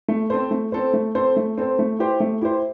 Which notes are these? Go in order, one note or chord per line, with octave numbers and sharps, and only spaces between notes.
A3
C4 A4 C5
A3
C4 A4 C5
A3
C4 A4 C5
A3
C4 A4 C5
A3
E4 G4 C5
A3
E4 G4 C5